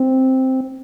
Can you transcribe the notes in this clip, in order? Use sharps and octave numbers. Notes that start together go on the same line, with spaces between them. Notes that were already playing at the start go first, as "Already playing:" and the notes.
Already playing: C4